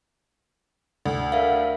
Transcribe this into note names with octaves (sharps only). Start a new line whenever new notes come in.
D2
A#4 E5 F5